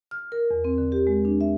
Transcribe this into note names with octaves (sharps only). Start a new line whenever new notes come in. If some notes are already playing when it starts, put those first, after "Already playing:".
F6
A#4
E2
C4
D3
G4
G#3
D4
E5